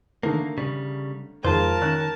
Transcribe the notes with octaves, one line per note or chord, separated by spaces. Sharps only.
D3 D#3 A3 A#3
C#3 G3
F2 D#3 G#3 F4 A#4 C5 A5
D#3 C#4 C#5 F#6